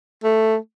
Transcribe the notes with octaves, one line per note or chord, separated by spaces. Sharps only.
A3